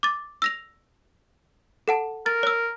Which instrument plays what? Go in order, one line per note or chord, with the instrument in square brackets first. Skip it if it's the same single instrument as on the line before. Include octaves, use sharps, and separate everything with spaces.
[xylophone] D6 A6
E6 A#6 F7
A4 F#5 A5
[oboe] A#4 [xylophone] A6
[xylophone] C#5 E6